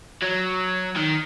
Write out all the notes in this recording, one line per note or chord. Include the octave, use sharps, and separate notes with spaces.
F#3
D#3